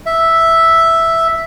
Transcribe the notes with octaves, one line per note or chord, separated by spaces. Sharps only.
E5